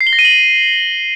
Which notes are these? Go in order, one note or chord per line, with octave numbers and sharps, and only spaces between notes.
C7
G7
A#6
D#7
F#7